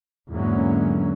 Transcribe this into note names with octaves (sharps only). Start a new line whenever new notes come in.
E2 G#2 D3 F#3 A#3 C#4